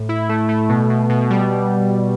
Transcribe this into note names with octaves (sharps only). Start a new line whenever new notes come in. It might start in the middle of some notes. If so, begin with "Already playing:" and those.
Already playing: A2
E4
A3
A3
B2
B2
B2
G3